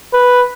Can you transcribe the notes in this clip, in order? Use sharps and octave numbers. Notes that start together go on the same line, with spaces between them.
B4